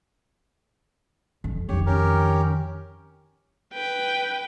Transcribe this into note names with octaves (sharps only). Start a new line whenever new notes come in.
F2
F2 D#3 G4 C#5
C#4 G4 A#4
B4 G5